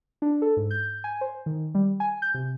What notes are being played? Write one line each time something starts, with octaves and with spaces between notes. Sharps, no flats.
D4
A4
G#2
G6
G#5
C5
D#3
G3
G#5
G6
C3